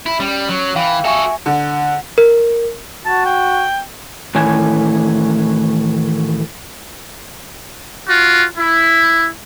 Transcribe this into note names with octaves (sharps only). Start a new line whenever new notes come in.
E4
G3 C#4
F#3
E3 F5 G5
F#4 A4 E5 G#5 C#6
D3
A#4
F#4 A5
G5
A2 D#3 E3 A3 C#5 G#5
F4 F#4
E4